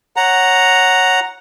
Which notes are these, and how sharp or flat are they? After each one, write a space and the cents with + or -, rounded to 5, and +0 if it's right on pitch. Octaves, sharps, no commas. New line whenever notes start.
C#5 -10 F#5 +0 A#5 +0